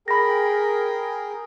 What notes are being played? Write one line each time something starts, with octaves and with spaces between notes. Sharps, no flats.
G#4 A#4 G5 B5 A#6